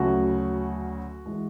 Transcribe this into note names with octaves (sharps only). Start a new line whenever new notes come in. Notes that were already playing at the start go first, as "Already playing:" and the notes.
Already playing: D2 C#3 F#3 A3 F#4
E3 G#3